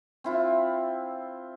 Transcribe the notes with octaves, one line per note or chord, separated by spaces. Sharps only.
C4 E4 F4